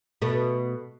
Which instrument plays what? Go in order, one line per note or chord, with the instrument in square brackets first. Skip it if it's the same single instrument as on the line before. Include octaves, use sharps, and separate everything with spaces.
[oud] B2 A3